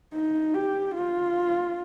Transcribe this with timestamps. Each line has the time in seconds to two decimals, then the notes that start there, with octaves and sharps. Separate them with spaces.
0.14 D#4
0.54 G4
0.95 F4